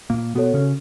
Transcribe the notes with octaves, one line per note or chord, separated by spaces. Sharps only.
A#2 A#3
B2 B3 F#4 A4 C#5
C#3 C#4